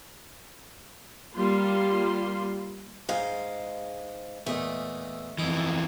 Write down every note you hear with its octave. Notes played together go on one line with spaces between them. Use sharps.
G3 A#3 F4 C6
G#2 G#3 F5
E2 A#2 A3 D#5
F2 E3 D#4